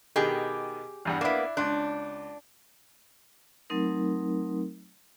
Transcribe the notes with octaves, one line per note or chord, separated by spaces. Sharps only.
B2 D#3 G4 G#4
E2 G2 F#5
A#3 B3 D4 E4
C#2 D4 C6 F#6
F#3 A3 C4 D#4 A#4